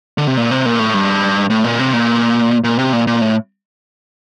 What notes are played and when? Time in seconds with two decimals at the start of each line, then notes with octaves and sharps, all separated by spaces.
0.18 D3
0.27 C3
0.37 A#2
0.51 C3
0.66 A#2
0.79 A2
0.94 G2
1.50 A2
1.64 A#2
1.79 C3
1.93 A#2
2.64 A#2
2.79 C3
2.93 A#2
3.07 A#2
3.21 A2